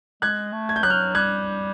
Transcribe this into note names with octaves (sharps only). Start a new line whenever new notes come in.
G#3 F#6 G#6
A3
G#6
G6
F#3 F#6
F6 G6
G3 F#6 G#6